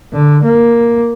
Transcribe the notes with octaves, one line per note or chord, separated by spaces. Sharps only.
D3
A#3